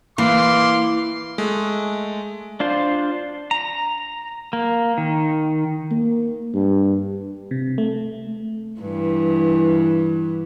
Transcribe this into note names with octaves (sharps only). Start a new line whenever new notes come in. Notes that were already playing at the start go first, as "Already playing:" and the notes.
E3 A#3 F5 C6 D6
G#3 A3
D4 F4 C5
A#5
A#3
D#3
A#3
G2
C3
A3
G2 E3